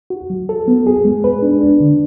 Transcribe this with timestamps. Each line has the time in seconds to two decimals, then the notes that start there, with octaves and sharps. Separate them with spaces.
0.10 F#4
0.30 F#3
0.49 A4
0.68 B3
0.87 G#4
1.05 G#3
1.24 B4
1.42 D4
1.61 D4
1.80 D3